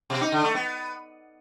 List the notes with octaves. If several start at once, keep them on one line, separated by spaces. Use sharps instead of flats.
B2
D#4
D3
A3
B3